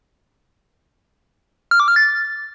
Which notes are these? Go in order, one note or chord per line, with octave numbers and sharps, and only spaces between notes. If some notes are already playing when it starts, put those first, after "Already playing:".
F6
D6
F6
A6